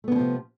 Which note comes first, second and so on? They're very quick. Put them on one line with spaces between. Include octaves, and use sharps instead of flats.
A3 B3 E3 F3 C3